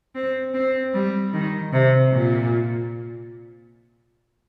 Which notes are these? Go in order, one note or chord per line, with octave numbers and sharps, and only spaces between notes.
C4
C4
G3
D#3
C3
A#2